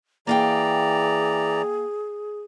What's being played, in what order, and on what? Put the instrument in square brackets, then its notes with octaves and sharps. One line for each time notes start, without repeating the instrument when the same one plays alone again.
[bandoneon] E3 D5 A#5 [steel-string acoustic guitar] A#3 F5 G5 [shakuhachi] G#4